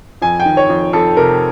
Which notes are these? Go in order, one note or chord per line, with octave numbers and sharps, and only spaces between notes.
F2 G#5
G5
D#3
C#5
F2
F2 A4
C3 A#4